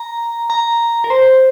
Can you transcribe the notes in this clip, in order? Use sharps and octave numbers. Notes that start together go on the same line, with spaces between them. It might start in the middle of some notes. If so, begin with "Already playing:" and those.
Already playing: A#5
A#5
A#4
C5